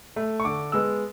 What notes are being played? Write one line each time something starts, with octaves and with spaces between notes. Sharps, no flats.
A3
C#6
D3 D6
G#3 B3 E6